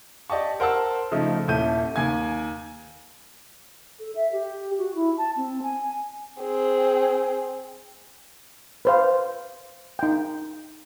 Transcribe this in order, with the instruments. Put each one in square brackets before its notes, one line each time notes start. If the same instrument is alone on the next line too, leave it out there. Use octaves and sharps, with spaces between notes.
[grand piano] G4 D5 D#5 G5 A5 C#6
A#4 C5 F#5 A5 C6 E6
C#3 F3 A3 D#4
D#1 C#4 E4 A4 G6 D#7
D#2 G#5 G#6
[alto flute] A4
E5
G4
F#4
E4
A5
C4
G#5
[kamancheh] C4 G#4
[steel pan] B4 C5 F5
D#4 G5